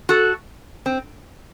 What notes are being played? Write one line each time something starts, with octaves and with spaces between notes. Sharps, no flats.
F#4 A4
C4